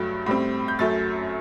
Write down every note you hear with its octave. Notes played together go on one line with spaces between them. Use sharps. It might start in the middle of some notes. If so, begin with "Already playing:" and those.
Already playing: G2 F#3 A3
A2 G3 C4
G6
F#2 F#3 A3 A6